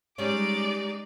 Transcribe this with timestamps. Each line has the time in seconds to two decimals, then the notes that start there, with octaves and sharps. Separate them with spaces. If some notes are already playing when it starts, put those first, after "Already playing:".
0.18 G3 G#3 C#4 D#4 D5 D6